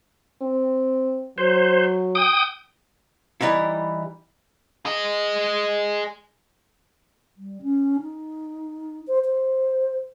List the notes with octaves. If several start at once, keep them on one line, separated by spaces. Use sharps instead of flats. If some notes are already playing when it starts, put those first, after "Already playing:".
C4
F#3 C5
G5 D#6
E3 G3 D#4 E4
G#4 D#5
G3
C#4
D#4
C5
C5